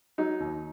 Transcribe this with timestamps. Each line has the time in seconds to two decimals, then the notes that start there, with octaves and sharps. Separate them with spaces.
0.18 F#3 D#4
0.40 D#2